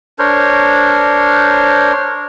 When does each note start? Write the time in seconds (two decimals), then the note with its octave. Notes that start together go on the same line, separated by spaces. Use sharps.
0.19 D4 A#4 C5 C#5